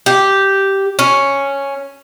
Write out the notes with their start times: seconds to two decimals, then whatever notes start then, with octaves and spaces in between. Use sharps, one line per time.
0.06 G4
0.99 C#4